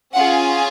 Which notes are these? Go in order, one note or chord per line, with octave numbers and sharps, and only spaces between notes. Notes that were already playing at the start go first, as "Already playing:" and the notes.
C#4 F4 G#4 F#5